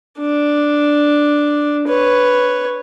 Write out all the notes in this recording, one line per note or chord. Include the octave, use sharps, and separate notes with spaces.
D4
B4 C#5